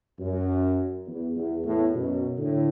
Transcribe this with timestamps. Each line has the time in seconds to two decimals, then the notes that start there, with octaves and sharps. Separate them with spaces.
0.19 F#2
1.07 E2
1.36 E2
1.65 E2 A2
1.94 F#2 B2
2.38 A2 D3